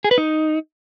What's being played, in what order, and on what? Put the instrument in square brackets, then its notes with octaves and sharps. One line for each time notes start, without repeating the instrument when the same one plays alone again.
[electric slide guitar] G#4
B4
D#4